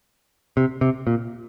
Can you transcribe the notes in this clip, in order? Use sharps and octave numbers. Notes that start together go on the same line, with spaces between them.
C3
C3
A#2